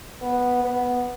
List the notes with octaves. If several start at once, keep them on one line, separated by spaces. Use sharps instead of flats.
B3
B3